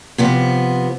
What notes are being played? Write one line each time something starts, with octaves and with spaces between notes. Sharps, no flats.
C3 F3 B3